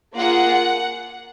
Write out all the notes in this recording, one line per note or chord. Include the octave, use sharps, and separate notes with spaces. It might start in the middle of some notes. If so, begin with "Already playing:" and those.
A#3 F4 G#4 F#5